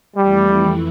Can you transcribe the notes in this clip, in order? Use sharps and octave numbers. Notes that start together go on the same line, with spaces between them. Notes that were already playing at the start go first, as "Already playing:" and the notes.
F2 E3 G3 A3 E4